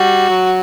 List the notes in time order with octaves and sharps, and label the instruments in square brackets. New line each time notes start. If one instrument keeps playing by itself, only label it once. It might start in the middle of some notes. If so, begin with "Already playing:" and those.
Already playing: [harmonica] G3 [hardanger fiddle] F#4
[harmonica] F#3